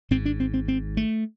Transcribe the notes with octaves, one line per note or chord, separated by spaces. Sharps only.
G#1 G#2 C4
D4
C4
C4
C4
A3